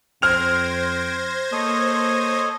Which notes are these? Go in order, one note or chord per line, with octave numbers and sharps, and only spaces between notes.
F2 C5 G5 F6 G#6 A#6 F7
A#3 A4 C#5 D#5